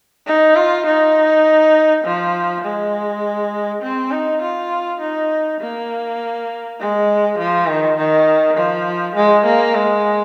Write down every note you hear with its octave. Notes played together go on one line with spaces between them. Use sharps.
D#4
F4
D#4
F3
G#3
C4
D#4
F4
D#4
A#3
G#3
F3
D#3
D#3
F3
G#3
A#3
G#3